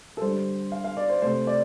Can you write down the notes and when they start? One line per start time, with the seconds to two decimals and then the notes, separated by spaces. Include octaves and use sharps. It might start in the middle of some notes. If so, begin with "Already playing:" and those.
0.17 A4
0.21 D3 G3 C5
0.72 F5
0.84 F5
0.97 D5
1.09 C5
1.22 C3 A3 C5
1.47 D5